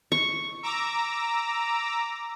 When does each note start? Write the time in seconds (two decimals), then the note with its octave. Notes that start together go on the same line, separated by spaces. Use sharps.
0.12 C#6
0.63 A#5 D6 E6